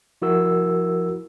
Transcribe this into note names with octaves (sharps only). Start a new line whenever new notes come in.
F3 E4 F#4 A#4 E6